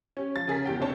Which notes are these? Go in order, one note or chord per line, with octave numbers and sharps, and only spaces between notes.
C#4 G4
F3 A6
C#3 G#4 A#4 B6
E2 G4 G5
C2 C4 D4 C5 C#5 A5